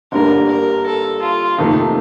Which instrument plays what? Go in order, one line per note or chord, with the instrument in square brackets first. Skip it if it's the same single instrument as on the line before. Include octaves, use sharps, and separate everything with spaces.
[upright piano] G1 G2 D3 G3 A#3 [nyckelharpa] A#4
[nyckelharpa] A#4
A4
F4
[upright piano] F2 C3 D#3 A3 D#4 [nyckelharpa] A#3